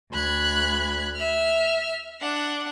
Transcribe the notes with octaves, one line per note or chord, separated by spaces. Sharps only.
D2 B5 F#6 G#6
E5 F6
D4 F#5